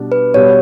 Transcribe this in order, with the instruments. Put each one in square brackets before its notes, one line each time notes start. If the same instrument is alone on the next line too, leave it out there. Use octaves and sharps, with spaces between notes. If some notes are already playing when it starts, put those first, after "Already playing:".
Already playing: [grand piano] B2 G3 D4
[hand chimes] B4
[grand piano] B2 G3 B3 [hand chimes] C#5